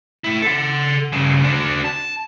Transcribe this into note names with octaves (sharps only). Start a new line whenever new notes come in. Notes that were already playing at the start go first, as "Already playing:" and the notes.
A3 E4
A4 F#5
G2 C#3
D4 F#4
A5